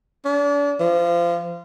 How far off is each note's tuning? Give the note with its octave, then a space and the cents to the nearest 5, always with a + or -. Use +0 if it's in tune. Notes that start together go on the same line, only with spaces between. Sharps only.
D4 -35
F3 -25